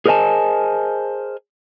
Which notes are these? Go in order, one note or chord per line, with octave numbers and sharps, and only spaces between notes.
G#4 A#4 C5 D#5 G#5 A5